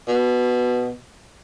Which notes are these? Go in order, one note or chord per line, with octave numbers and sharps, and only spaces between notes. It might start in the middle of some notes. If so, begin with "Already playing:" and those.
B2